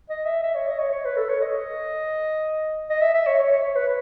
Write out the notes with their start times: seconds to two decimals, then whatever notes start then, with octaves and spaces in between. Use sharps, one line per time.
0.10 D#5
0.26 E5
0.43 E5
0.55 C#5
0.68 D#5
0.79 C#5
0.92 C#5
1.05 B4
1.17 A4
1.29 C#5
1.41 D#5
2.90 D#5
3.02 E5
3.14 E5
3.26 C#5
3.39 C#5
3.52 C#5
3.63 C#5
3.76 B4